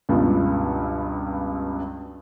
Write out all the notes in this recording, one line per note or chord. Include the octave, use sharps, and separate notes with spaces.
C#2 G2 B2